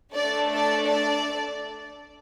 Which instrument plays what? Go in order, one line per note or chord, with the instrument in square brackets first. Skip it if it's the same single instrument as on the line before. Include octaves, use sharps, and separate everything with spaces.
[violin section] A3 D4 A4 D5
D5
D5